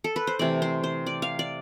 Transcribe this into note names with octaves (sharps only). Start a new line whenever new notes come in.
A4
B4
C5
C3 E3 A3 D5
C5
C5
D5
F5
D5